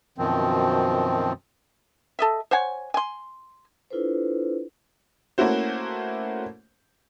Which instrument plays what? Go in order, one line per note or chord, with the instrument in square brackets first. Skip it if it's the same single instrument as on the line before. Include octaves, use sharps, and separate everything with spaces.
[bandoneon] F#2 B2 D#3 F3 C4
[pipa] A4 D#5 E5
C5 C#5 F#5 G#5
G#5 C6
[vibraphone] D4 E4 F4 A4 B4 C5
[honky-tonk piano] A3 A#3 C#4 E4 F#4 C5